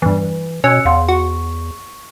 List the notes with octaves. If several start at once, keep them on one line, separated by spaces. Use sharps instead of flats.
E2 G2 E3
B2 C#4 E6 F#6 C#7
E2 F5 F#5 C6
F#4 C#6